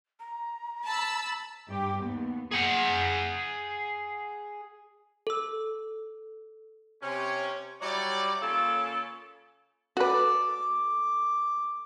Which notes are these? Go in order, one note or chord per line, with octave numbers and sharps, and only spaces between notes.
A#5
A5 B5 E6
G2 G4
D#2 B3
G#4 F#5
A4 E6
C3 C#4
F#3 G3 E4 C#5 D5
C#3 A#3 F4 A4 C#5
F#4 A4 B4 D5
D6